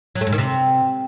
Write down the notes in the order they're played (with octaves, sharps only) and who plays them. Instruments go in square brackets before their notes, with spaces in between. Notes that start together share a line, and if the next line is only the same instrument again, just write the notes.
[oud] F#3
A3
G#2
D#3
C3